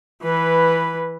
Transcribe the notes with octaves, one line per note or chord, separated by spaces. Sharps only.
E3 B4